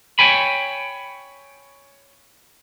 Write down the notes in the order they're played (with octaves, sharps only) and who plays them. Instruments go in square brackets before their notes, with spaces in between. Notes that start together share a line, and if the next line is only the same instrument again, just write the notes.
[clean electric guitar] C#5 G5 G#5 B5